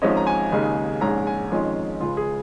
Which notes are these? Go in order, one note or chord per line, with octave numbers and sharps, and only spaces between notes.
G#1 G#2 F3 C#4 D#5
A#5
G#5
D#2 C#3 G#3 D#4
A#1 G#2 G#3 C#4 A#5
G#5
F2 D#3 G#3 C#4 F4
C#2 C#3 G#3 F4
G#4